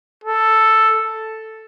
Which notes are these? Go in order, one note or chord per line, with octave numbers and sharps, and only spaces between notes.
A4